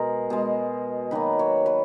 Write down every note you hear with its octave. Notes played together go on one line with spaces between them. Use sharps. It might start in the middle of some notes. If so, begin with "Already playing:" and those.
Already playing: B2 G#3 A#4
B2 G#3
D#3 F#3 A#3 B4
C#5
B4